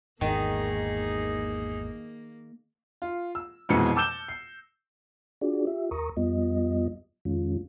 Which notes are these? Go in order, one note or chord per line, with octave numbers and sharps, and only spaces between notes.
G#1 E2 G#2 D#3 A#3 D#4 G#4
F4
E6
D#1 F2 B2 E3 G#3 C#7
A5 D6 E6 G6 E7 G7
C7
D4 F4 F#4 G#4 D5
F4 G4 E5
D#2 A#4 A#5 C#6 D#6
F2 G3 B3 F4 D#5
F2 D#3 G#3 C#4 F4